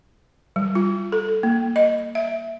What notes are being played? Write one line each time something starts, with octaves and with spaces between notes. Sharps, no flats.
G3
F4
A4
A#3
D#5
E5